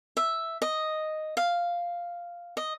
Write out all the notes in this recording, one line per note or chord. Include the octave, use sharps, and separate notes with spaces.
E5
D#5
F5
D#5